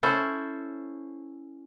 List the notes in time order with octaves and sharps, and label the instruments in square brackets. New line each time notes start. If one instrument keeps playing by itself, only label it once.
[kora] C#4 E4 A4 C5